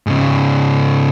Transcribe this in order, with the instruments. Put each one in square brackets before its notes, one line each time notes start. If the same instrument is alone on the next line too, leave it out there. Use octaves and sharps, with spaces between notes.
[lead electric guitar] G#2 C#3